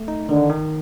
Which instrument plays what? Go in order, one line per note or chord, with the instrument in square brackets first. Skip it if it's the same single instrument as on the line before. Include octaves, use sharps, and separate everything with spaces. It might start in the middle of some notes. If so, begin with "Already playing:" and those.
Already playing: [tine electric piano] A3
D#4
[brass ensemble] D3 [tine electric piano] D#3
[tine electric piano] D#3